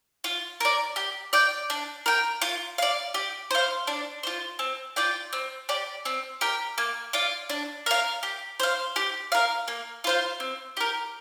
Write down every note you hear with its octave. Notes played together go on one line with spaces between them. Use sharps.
F4
A#4 D5
G4
D5 G5
D4
A#4 G5
F4
D5 F5
G4
C5 F5
D4
F4 C5
C4
F4 D5 G5
C4
G4 D5
C4
G4 A#4 G5
A#3
F4 D5 F5
D4
A#4 F5
G4
C5 F5
G4
A#4 F5
A#3
F4 C5 F5
C4
G4 A#4